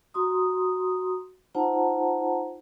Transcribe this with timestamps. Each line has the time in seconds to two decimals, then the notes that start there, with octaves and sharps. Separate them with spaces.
0.14 F#4 A#5 C6 D#6
1.55 D#4 F4 C5 F#5 A5 A#5